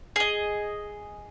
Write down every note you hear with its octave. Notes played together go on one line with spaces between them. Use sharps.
G#4 D#5